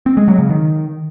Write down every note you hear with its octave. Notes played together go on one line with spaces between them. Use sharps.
C4
G#3
F#3
C#3
D#3